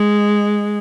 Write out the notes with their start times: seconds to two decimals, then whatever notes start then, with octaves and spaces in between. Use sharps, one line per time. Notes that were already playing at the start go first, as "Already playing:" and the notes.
Already playing: G#3